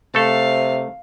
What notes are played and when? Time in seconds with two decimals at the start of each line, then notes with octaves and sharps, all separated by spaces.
0.15 C3 A3 A4 F5